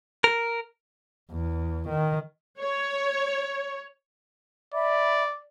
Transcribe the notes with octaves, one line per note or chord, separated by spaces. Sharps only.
A#4
E2
D#3
C#5
D5 E5 B5